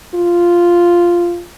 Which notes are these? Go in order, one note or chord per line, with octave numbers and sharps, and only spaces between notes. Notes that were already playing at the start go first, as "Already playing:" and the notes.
F4